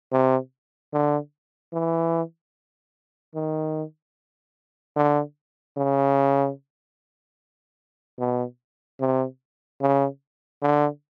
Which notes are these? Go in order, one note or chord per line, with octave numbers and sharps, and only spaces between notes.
C3
D3
E3
D#3
D3
C#3
B2
C3
C#3
D3